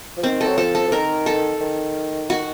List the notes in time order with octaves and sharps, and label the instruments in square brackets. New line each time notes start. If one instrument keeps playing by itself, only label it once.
[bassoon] F3
[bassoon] D#3 [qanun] C4
[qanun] A4
[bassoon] F#3
[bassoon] F3 [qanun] A4
[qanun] A4
[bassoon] F3
[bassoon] D#3 [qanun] A#4
[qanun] A4
[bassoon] D#3
[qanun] F#4